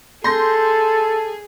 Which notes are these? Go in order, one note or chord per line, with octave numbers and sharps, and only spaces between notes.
G#4 A4 C6 G6 A#6